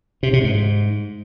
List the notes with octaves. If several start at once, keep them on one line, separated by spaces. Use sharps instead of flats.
C3
C3
G#2